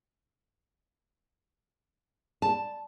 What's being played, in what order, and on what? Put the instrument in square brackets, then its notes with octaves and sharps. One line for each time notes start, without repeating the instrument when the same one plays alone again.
[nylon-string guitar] A5